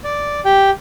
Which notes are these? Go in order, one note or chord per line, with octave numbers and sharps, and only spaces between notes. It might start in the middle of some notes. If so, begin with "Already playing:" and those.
D5
G4 G5